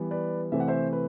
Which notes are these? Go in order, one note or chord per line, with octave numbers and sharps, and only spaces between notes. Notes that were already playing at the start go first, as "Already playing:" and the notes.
Already playing: E3 G3 B3
B4 D5
C3 E3 A3 C4 E5
F#5
C5 E5
B4